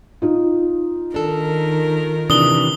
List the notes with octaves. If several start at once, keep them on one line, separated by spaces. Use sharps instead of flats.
D#4 F4
D#3 D4 A4 A#4
C3 E3 D4 D#6 G7